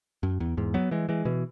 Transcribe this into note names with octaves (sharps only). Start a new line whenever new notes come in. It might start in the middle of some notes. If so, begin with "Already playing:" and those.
F#2
E2
E2 G#2
F#3 B3
E3 G#3
E3 G#3
B2 E3